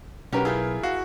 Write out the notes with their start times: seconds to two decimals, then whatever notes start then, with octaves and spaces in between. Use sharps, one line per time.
0.32 B1 C#4 F#4 G4 A#4 B4
0.45 E4 F4 G4 G#4 A#4
0.83 F#4 F5